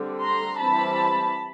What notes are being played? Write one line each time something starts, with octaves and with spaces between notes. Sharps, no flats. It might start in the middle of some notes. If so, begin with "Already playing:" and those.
Already playing: D3 G3 C4
A#5 C6
E3 G3 C4 A5 B5